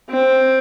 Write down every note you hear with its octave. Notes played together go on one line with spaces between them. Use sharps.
C4